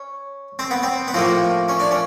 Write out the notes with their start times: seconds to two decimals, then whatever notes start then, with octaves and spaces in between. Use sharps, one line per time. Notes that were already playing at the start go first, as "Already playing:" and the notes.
Already playing: C#4
0.59 C4
0.71 B3
0.83 C4
1.08 B3
1.14 A2 F3 A#3 C4
1.68 C#4
1.80 D4
1.91 C#4